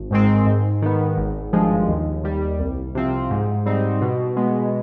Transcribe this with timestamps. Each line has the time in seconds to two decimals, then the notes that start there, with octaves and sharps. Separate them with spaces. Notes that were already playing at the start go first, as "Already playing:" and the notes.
Already playing: G#1
0.11 G#2 D#3 G#3 C4
0.46 G#2
0.82 D#3 B3
1.17 G#1
1.53 G2 F3 G#3
1.88 D#2
2.24 D#3 G3
2.60 C2
2.95 C3 F3 C4 F4
3.30 G#2
3.66 G3 C4 D#4
4.02 B2
4.37 G#3 B3